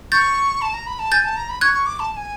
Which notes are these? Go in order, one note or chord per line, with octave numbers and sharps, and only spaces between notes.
C#6 G6 A6
A5
A#5
B5
A5
G#5 G6 A6
A5
A#5
B5
C#6 F#6 G#6
C#6
D6
A5
A5
G#5